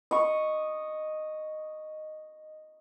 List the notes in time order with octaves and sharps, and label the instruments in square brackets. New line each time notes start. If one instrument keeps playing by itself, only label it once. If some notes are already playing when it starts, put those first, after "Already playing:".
[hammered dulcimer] D#5 C#6